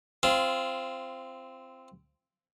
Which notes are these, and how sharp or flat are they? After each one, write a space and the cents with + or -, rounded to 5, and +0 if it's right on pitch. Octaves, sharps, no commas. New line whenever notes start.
C4 +0 F4 -20